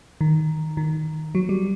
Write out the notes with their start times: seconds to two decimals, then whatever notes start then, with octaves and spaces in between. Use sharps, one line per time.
0.21 D#3
0.77 D#3
1.35 F#3
1.49 G3